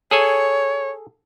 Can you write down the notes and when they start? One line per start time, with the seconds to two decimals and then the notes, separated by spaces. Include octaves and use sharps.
0.11 G#4 A4 C#5 G#5